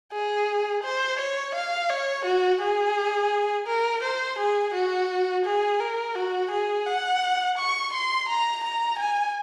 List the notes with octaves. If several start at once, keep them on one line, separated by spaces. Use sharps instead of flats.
G#4
C5
C#5
F5
C#5
F#4
G#4
A#4
C5
G#4
F#4
G#4
A#4
F#4
G#4
F#5
C#6
C6
A#5
A#5
G#5